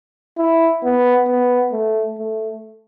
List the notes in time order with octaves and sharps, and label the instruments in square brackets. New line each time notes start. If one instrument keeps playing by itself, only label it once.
[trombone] E4
B3
B3
A3
A3